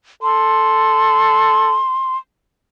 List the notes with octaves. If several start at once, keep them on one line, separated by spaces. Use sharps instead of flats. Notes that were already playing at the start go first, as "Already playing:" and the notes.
A4 C6